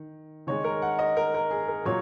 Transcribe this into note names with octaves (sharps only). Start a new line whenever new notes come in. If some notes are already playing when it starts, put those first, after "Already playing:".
Already playing: D#3
D#3 G#3 C#5
A#4
F#5
D#5
A#4
A#4
G#4
A#4
A#2 F#3 A#3 C#5